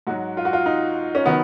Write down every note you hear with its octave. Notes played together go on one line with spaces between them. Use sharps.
G#2 F#3 F#4
F4
F#4
F4
D#4
C#4
D#3 F#3 B3